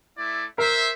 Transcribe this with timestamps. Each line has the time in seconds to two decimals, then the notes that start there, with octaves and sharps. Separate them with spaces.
0.18 A3 E4 D5
0.58 A#4 C5 E5